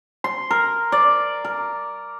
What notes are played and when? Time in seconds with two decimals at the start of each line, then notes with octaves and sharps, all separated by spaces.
0.24 C6
0.51 A#4
0.92 D5
1.45 A#4